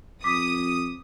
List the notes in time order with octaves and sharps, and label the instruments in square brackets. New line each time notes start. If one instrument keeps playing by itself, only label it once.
[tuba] F2 [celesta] D6 B6 [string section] D#6